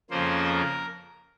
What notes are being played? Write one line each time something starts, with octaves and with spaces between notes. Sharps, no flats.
F2 C#3 F3 A#3 C5
A#4